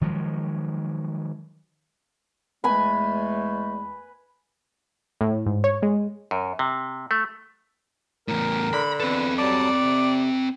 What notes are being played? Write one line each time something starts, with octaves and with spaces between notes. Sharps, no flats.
D#3 F3 F#3 G#3
E2 G#3 A3 B4 G#5 B5
A2
G#2
C#5
G#3
F#2
C3
A3
E2 A2 A#4
D3 B5
E2 C4 A4 B4
F#3 G3 D5 A5
C3